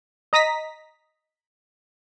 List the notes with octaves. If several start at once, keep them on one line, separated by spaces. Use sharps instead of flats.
D#5 A#5 D#6 A#6 B6